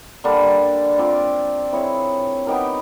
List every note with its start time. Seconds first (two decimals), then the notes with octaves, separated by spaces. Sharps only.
0.24 D3 G3 A#3 D4
0.99 C4 F4 A#4 D5
1.73 C4 E4 G#4 C#5
2.47 B3 D#4 G4 A#4